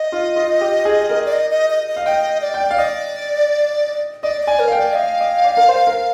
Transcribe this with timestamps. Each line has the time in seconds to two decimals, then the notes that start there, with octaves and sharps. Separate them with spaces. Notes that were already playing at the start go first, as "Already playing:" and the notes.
Already playing: D#5
0.12 F4
0.36 F4
0.61 G4
0.85 G#4
1.10 A#4
1.26 D5
1.33 D#5
1.51 D#5
1.70 D#5
1.88 D#5
1.96 F5
2.05 D#5 G5
2.41 D5
2.54 G5
2.71 F5
2.78 D5 D#5
4.23 D5 D#5
4.41 D5
4.47 G#5
4.59 A#4
4.68 F5
4.72 G5
4.78 D5
4.95 D#5 F5
5.20 D#5
5.45 D5
5.57 A#4
5.69 C5
5.87 A#4